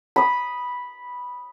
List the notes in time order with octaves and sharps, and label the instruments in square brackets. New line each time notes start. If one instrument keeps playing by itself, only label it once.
[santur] B5 D#6